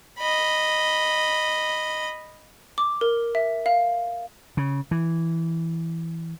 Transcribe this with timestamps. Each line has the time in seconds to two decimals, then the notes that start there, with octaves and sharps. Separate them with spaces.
0.19 D#5 B5
2.78 D6
3.01 A#4
3.35 E5
3.66 F5
4.57 C#3
4.91 E3